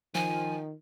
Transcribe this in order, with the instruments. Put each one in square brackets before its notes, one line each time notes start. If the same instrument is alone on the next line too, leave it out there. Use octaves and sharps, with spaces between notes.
[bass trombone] D#3 [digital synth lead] F3 [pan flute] G#5